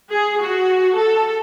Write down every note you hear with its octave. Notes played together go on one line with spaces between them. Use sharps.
G#4
F#4
A4